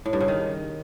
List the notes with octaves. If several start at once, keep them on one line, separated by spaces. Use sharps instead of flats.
A2
G2
C#3
D#3